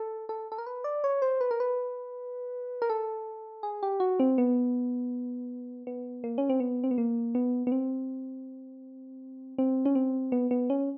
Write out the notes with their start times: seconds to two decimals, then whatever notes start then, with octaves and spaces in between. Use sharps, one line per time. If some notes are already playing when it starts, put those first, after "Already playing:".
Already playing: A4
0.29 A4
0.52 A4
0.58 A#4
0.66 B4
0.84 D5
1.04 C#5
1.22 C5
1.41 B4
1.51 A#4
1.60 B4
2.82 A#4
2.90 A4
3.63 G#4
3.83 G4
4.00 F#4
4.20 C4
4.38 B3
5.87 B3
6.24 A#3
6.38 C#4
6.50 C4
6.60 B3
6.84 C4
6.91 B3
6.98 A#3
7.35 B3
7.67 B3
7.72 C4
9.58 C4
9.86 C#4
9.95 C4
10.32 B3
10.51 B3
10.70 C#4